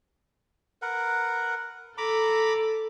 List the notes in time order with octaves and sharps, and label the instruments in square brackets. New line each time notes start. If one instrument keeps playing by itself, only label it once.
[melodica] A#4 B4 F#5
[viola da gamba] A4 [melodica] A#5 B5 D6